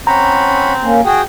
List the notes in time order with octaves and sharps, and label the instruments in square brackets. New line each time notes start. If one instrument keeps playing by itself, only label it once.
[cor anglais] C4 [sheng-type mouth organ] C#4 F#5 B5 [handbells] A#5
[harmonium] A#3 C#4
[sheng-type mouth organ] F#4 G#4 [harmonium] G5